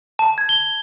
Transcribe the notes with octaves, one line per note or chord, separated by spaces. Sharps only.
A5
G#6
G7